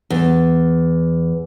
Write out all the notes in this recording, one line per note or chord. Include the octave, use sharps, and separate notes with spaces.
E2